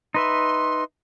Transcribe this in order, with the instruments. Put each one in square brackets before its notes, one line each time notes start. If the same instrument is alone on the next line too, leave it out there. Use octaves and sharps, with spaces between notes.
[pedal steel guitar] D#4 B4 E5 [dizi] C6